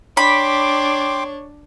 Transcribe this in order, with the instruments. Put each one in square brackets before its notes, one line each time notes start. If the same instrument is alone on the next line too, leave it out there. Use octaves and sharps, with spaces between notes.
[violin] D4 [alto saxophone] C#5 [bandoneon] G5 C6 D6 [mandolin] B5